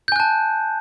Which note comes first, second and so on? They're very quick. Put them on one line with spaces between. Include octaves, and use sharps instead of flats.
G6 G#5 F#6 A5